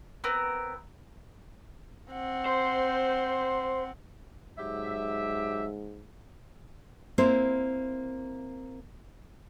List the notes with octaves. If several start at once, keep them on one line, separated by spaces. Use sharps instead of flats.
B3 C4 A#4
C4 F#5
C5
G#2 F#3 G4 E5
A#3 C4 E4 C5